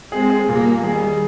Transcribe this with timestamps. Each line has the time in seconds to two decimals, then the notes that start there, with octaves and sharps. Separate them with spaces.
0.12 G#3 C4 G#4
0.30 G#4
0.48 A#2 G3 A#3
0.66 G#4
0.83 D#3 G3 G#4
1.02 G#4